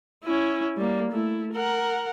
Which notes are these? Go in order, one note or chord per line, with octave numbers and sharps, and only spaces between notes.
C#4 E4
G3 A#3
A3 E4
A#4 F#5